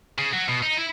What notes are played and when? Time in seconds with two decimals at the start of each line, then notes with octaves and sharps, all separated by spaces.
0.18 C#3
0.33 F#3
0.48 B2
0.62 D#4
0.77 E4